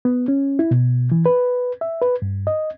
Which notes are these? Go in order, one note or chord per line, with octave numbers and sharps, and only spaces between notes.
B3
C#4
E4
B2
E3
B4
E5
B4
G2
D#5